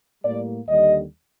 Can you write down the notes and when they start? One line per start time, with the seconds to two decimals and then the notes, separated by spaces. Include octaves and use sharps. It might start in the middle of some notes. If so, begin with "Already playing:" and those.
0.24 A2 G3 A#3 D5
0.68 D#2 D3 G3 D#5